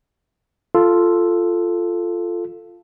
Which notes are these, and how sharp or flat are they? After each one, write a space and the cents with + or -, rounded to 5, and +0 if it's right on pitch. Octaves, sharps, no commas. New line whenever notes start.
F4 -5 A4 +0